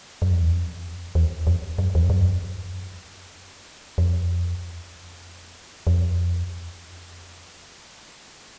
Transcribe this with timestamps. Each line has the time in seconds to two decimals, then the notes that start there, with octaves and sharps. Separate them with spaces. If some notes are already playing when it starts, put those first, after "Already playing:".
0.22 F#2
0.31 F2
0.41 E2
0.52 F2
1.15 E2
1.47 F2
1.78 F#2
1.95 E2
2.02 F2
2.10 F#2
3.98 F2
5.87 F2